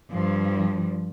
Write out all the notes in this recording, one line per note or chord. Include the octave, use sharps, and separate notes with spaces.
G2 F3